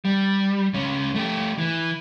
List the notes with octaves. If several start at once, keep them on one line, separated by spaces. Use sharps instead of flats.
G3
C#2 C#4
A3 G4
E3